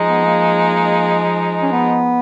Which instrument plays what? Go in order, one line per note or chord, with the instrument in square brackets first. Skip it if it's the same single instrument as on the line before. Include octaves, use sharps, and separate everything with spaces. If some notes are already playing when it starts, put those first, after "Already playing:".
Already playing: [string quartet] F3 G#3 D#4
[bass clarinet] B3
A#3
C#4
B3